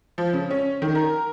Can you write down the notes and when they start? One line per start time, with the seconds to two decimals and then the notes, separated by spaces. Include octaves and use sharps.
0.18 F3
0.33 C#3
0.51 C#4
0.82 D#3
0.95 A#4